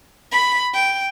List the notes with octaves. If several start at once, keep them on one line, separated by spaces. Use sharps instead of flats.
B5
G5